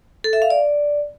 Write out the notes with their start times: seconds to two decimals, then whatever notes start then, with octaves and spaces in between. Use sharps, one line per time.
0.24 A4
0.33 E5
0.42 F5
0.50 D5